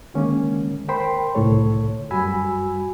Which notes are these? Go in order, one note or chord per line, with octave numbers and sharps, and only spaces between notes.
D3 D#3 G#3 A#3 C#4
A#4 C5 G5 B5 C6
C2 A2 D3 A3 A4 C#5
F#2 G3 F#4 G#5 B5 E6